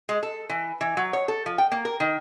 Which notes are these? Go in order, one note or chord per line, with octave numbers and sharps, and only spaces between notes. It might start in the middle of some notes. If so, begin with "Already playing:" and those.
G#3
A4
E3
E3
F#3
C#5
A4
F3
G5
A#3
A#4
D#3